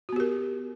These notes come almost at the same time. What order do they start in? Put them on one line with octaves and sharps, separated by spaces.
F#4 B3 G4 A#4